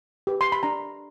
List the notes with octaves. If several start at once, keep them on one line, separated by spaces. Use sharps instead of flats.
G4 B4
C6
B5
D4 A#5